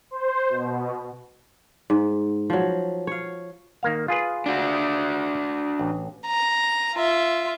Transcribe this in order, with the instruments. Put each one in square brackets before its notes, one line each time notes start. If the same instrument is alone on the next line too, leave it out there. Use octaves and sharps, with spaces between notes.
[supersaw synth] C5
B2
[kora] G#2
F3 F#3
C#5 F5
[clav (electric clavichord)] D#3 A#3 F5
F4 G#4 B4
[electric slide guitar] D4 F#4
[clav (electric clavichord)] A1
[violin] A#5
F4 E5